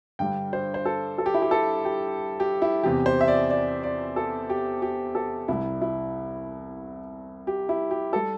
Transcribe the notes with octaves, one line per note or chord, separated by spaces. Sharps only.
G2 D3 G3 G5
C5
C5
A4
A4
G4
E4
G4
A4
G4
G4
E4
E2 C3 E3 G4
C5
E5
D5
D5
D5
A4
G4
G4
A4
C2 C3 G3 E4
E4
G4
E4
G4
G3 A4